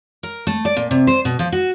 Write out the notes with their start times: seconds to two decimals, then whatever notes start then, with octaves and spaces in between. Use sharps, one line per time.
0.23 A#4
0.47 A3
0.65 D5
0.76 A#2
0.91 C3
1.07 C5
1.25 B2
1.39 F3
1.52 F#4